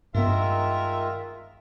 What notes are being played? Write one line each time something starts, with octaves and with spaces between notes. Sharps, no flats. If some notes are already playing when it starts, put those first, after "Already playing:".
G2 D#3 G#3 B3 F4 A#4 E5